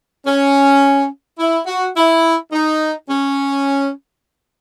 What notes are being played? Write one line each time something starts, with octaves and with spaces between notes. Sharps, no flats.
C#4
E4
F#4
E4
D#4
C#4